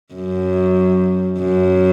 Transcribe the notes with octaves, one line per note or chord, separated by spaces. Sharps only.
F#2
F#2